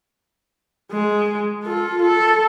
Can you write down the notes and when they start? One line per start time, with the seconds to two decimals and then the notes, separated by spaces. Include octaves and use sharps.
0.92 G#3
1.64 F4 A4
2.02 A4